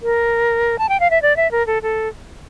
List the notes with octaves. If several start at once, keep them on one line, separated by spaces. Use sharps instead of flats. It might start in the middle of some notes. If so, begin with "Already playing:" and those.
A#4
A5
G5
F5
E5
D5
E5
A#4
A4
A4